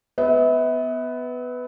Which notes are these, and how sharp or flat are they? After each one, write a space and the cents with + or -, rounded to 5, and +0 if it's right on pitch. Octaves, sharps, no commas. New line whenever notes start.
B3 +10 E5 -35